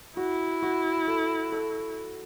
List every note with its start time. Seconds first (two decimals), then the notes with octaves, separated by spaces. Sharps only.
0.17 E4 F#4
0.63 F#4
1.08 A4
1.52 A4